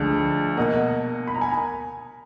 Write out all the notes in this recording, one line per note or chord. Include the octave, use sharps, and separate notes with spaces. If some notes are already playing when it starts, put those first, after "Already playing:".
Already playing: D2 D3 F3 G#3
B2 A#3 D#5 F#5
B5
A#5
G#5